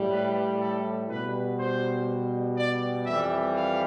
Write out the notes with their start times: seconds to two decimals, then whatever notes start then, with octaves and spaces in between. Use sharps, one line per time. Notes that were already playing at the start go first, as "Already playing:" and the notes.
Already playing: A2 G3
0.11 B4
0.60 A4
1.09 B2 G3 B4
1.58 C5
2.57 D5
3.06 F2 E3 G3 E5
3.55 F5